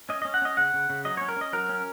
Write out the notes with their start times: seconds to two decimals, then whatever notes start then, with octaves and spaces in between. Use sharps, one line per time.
0.09 C#4 D#5
0.22 C#4 D#5
0.34 F#5
0.42 C#4 D#5
0.57 C#3 F#5
0.74 C#3
0.90 C#3
1.05 F#3 D#5
1.17 C#4 C#5
1.29 A#4
1.36 C#4 D#5
1.53 F#3 A#4
1.69 C#4